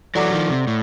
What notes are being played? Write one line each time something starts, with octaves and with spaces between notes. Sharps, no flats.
E3 F#3 A4 D5 F#5 A#5 D6
D#3 F3
C3
A2